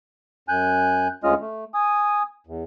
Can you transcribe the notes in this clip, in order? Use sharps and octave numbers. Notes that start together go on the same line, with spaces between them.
F#2 G#5 F#6 G6
D2 G#3 C#4 F4 D#5 F6
A3
G#5 D#6
E2